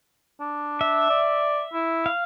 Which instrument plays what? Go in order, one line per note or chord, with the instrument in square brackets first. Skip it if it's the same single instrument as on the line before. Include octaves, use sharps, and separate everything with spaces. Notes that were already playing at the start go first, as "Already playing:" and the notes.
[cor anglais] D4
[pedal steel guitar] E5
[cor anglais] D5
E4
[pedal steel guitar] F5